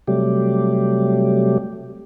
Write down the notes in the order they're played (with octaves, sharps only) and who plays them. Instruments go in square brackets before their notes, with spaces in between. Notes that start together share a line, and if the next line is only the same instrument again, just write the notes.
[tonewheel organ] C3 F#3 G3 A3 G4